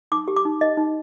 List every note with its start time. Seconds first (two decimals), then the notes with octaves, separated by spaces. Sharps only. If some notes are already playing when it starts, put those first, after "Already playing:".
0.12 D#4 D6
0.28 G4
0.37 D6
0.45 D#4
0.61 D#4 D#5
0.77 D#4